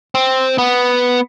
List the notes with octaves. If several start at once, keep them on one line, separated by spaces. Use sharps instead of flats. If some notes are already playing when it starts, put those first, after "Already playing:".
C4
B3